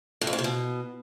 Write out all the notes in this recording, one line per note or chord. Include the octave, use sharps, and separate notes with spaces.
A2
F2
C#3
C3
B2